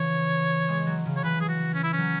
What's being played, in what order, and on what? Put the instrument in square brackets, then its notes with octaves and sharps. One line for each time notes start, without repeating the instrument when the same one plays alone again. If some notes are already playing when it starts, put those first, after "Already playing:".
Already playing: [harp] C#3 E3 [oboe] C#5
[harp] G#3
F#3
C#3
[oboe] C#5
[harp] E3 [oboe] B4
[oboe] G#4
F#4
C#4
E4
[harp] F#3 [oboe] C#4